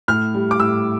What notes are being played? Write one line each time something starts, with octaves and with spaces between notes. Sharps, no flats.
A2 F6
G3
D6
A2 E6